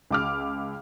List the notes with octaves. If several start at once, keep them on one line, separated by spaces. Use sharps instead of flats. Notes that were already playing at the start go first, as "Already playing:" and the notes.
C#2 D6 F6